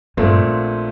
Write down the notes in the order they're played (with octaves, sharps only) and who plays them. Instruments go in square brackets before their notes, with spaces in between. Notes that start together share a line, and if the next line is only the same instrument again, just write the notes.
[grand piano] A#1 A#2 A3 C4 [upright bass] G2